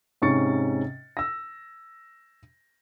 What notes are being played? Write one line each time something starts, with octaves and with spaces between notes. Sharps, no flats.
G#2 C3 C#4 C#6 A6 C#7
E6 A#6